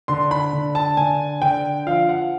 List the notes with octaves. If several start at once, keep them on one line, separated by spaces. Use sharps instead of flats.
D3 C6
B5
D3
A5
D3 G#5
D3 G5
F3 F5
F#5